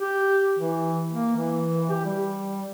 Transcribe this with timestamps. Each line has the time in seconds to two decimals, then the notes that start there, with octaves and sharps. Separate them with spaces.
0.01 G4
0.59 E3
1.12 A#3
1.36 E3
1.90 G4
2.05 G3